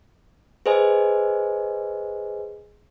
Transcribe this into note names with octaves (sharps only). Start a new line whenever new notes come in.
G#4 B4 C5 D#5 G#5